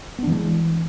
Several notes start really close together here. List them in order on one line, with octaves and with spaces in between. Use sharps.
B3 D4 E3 G#3